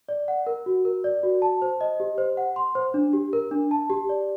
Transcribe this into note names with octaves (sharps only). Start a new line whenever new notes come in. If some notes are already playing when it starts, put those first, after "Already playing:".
D5
F#5
A#4
F#4
A#4
D5
F#4
A5
C5
D#5
G4
C5
F#5
C6
C5
D4
G4
A#4
D4
A5
G4
D5